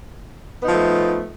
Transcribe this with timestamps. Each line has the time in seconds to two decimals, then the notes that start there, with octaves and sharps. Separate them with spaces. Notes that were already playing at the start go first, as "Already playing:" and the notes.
0.62 B3
0.65 D#4
0.68 F3
0.71 A3